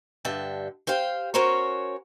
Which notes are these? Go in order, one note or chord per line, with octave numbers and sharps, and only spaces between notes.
G2 D3 E5 G5 A5
G4 C5 F5 G5
C#4 F#4 A#4 C5 C#5